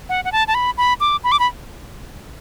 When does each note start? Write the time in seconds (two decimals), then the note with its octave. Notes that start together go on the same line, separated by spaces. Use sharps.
0.09 F#5
0.25 F#5
0.32 A5
0.48 A5
0.55 B5
0.78 B5
1.00 D6
1.24 B5
1.32 D6
1.40 B5